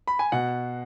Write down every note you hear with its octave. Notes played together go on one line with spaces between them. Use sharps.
B5
G#5
B2 F#5